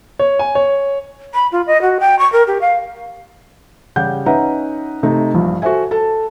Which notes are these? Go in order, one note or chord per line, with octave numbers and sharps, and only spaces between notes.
C#5
G#5
C#5
B5
F4
D#5
F#4
G5
C#6
A#4
G4
F5
C#3 G3 G4 F#5 G6
C#4 D#4 B4 E5 F#5 A#5
C3 A3 D#4
A#1 G2
F#4 A4 C5 E5 G#5
A4 A5